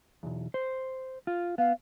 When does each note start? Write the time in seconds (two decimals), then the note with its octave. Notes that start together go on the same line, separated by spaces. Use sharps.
0.23 B1 E2
0.54 C5
1.27 F4
1.58 B3 F5